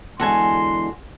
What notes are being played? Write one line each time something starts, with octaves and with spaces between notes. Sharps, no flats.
E2 D3 G#3 F#4 A4 G#5 C6